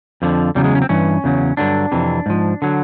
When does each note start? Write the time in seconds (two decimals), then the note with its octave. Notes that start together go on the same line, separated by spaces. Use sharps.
0.22 F2 D3 F3
0.55 E2 C#3 F#3 G3
0.64 G#3
0.75 C#4
0.82 C4
0.89 G2 E3 C#4
1.24 E2 C#3 F#3
1.57 G2 D3 F#3 D4
1.92 F2 C3 E3
2.26 G#2 F3
2.62 D3 F#3